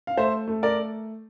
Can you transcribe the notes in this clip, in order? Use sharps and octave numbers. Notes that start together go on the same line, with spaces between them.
F5
A3 C5 E5
A3
A#4 D5